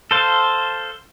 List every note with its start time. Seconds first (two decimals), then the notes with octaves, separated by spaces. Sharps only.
0.11 A4 C5 F5